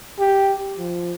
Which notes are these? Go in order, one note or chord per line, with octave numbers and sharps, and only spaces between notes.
G4
F3